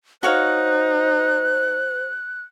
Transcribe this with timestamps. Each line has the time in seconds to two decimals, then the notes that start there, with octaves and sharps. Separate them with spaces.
0.23 D#4 F#4 C5 C#5 F5 F#6